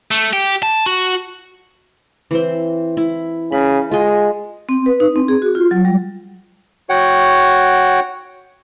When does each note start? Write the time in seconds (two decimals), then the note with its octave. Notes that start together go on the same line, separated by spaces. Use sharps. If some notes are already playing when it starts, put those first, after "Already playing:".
0.11 A3
0.33 G4
0.63 A5
0.86 F#4
2.31 E3 C4 C5
2.97 E4
3.52 C#3 B5
3.91 G#3 F4 D#5
4.69 C4
4.86 B4
5.00 D#4
5.16 C4
5.28 G#4
5.42 F#4
5.55 F4
5.71 F#3
5.85 G3
6.90 F#4 C#5 F#5 G5